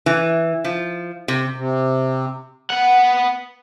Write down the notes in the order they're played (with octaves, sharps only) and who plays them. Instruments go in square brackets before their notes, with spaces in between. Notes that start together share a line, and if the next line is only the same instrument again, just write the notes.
[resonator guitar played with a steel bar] E3
F3
C3
[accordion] C3
[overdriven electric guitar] B3 F#5